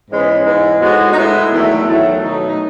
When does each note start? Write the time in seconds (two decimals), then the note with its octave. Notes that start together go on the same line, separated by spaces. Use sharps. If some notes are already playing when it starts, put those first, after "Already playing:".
0.11 G#2 E3 G#3 B3 C#4
0.29 C#4
0.46 G#2 E3 G#3 B3 D#4
0.81 A2 G#3 B3 F#4
1.13 D#4
1.17 A2 G#3 B3 E4
1.52 E2 D#3 F#3 A3
1.88 E2 D#3 F#3 A3
2.23 B2 F#3 A3 D#4
2.48 D#4